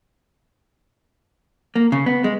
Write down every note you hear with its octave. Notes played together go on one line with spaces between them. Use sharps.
A#3
C#3
B3
G#3